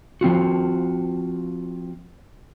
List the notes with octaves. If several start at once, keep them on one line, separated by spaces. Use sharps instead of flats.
F3 C4 F4 F#4